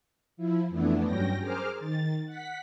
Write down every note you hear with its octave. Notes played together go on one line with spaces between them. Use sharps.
F3 E4
F2 E3 A3 B3 D4 E4
G2 F#3 C#4 G5 A#6
G#4 A#4 C5 D6 F6
D#3 A6
F#5 B6